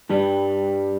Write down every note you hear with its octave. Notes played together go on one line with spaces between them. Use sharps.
G2 G3